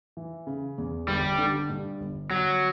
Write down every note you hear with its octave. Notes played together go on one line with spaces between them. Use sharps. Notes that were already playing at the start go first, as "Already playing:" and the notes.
E3
C#3
E2
G1 G3
D3
G2
G1
G1 F#3